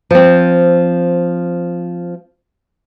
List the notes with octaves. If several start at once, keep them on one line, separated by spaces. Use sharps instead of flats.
F3 C4